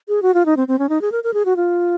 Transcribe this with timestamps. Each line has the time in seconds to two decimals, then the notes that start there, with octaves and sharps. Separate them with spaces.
0.08 G#4
0.22 F#4
0.34 F4
0.46 D#4
0.57 C4
0.68 C4
0.79 C#4
0.89 D#4
1.01 G#4
1.12 A#4
1.24 A#4
1.34 G#4
1.45 F#4
1.56 F4